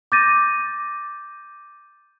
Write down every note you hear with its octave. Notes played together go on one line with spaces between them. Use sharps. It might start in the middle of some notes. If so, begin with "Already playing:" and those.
D6 G6 A6 A#6 D#7